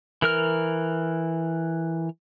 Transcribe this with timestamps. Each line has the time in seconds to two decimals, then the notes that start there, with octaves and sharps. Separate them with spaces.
0.22 E3 A#4 F6